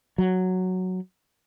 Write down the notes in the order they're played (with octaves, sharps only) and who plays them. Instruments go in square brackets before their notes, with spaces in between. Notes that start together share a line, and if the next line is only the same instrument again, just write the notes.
[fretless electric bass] F#3